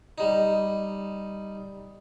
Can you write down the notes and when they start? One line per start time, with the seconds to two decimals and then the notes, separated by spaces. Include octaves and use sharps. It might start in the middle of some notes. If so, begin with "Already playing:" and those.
0.18 G3 D#4